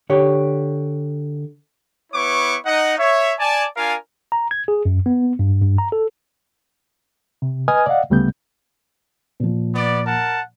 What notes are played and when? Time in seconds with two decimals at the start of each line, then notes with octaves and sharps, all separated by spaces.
0.10 D3 G4 C#5
2.13 B3 E4 B4 C#5 C#6 D6
2.65 D#4 D#5 F#5
2.99 C#5 E5
3.39 D5 G#5 A5
3.77 D4 F4 A#4 F5 G#5
4.32 A#5
4.51 G#6
4.68 G#4
4.85 F#2
5.06 B3
5.39 G2
5.62 G2
5.78 A#5
5.92 A4
7.42 C3
7.68 B4 D#5 G#5 D#6 F6 G#6
7.86 D5 D#5 F5 F#5
8.10 D2 C#3 G3 A3 B3 G6
9.40 A#2 F3
9.75 B3 D5
10.06 A#4 F#5 A5